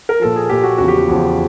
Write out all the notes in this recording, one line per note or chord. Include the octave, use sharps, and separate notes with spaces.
A#4
A#2 F3 A4
G#4
A#2 F3 G4
F#4
E2 C#3 F3 F#4
G4
F#4
E2 C#3 F3